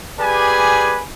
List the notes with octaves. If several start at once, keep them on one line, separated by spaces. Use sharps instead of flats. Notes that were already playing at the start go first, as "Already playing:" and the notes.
G4 G#4 B4 D5 G#5